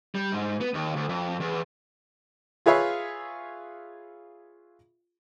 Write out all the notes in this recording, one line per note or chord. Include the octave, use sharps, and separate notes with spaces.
G3
G#2
B3
D#2
D2
F2
E2
F4 G#4 B4 C#5 E5 F5